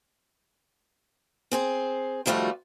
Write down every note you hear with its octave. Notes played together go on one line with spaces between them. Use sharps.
C4 G#4 C5
D#3 F3 G3 A3 F4 F#4